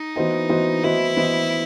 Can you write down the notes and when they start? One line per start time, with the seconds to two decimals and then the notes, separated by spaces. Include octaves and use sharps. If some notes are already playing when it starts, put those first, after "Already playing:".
Already playing: D#4
0.16 E3 B3 F#4 C5 D#5
0.49 E3 B3 F#4 C5 D#5
0.83 E3 B3 E4 F#4 C5 D#5
1.17 E3 B3 F#4 C5 D#5